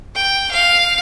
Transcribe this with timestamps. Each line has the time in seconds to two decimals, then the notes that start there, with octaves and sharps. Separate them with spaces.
0.15 G5
0.51 F5